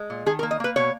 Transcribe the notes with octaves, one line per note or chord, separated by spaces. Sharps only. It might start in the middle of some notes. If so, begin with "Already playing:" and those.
Already playing: G#3
A#2
D#3 G#4
A#4
A#3
D#5
A#3 B4
B2 C#5